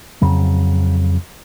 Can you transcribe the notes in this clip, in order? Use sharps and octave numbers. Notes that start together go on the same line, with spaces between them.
F2 C#3 F#3